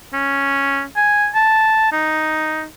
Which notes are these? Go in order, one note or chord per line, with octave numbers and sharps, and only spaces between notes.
C#4
G#5
A5
D#4